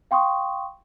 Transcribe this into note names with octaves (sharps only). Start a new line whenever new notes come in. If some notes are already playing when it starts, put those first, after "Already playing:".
F5 G5 C6 C#6 D#6